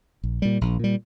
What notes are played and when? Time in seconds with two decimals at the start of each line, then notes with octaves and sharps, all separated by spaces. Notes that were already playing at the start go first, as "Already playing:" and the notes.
0.24 A#1
0.42 A#2 G3
0.61 A#1
0.79 A#2 G3